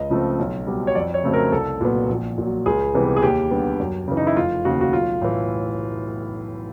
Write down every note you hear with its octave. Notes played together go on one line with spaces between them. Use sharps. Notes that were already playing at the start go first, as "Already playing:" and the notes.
Already playing: C#2 D#5
C#3 F3 A3 C4
B1
B2 G3
C#5
F2 D5
C#5
C#3 F#3 A3 C4
A#4
C2 A4
A#2 F#3 B3
A#1
A#2 F#3
C#2 G#4
C3 E3 G3 B3
G#4
D#2 G4
D3 G3 B3
F#2
C#3 E3
D#4
E4
F1 F4
D#2 C#3 F3 F#4
F#4
B1 F4
A2 E3